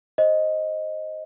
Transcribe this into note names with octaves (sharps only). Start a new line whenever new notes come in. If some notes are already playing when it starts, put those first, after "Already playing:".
C5 D#5